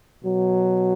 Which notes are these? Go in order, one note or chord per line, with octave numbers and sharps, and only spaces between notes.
B2 F#3